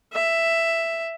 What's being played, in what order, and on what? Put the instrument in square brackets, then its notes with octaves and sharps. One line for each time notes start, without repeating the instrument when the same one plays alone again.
[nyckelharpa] E5